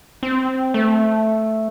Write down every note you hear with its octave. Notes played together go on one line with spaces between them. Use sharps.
C4
A3